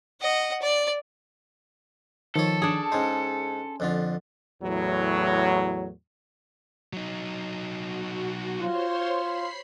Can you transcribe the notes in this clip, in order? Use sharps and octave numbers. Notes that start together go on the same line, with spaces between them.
D#5 F#5
D5
D#3 F3 A4 C#5
D4 G#4
G#2 C#4 D#4 G#5 C6
F2 D3 F4
E2 A2 F#3
F#3 D#4
F#4
F4 C5 C#5 C6
B5 C7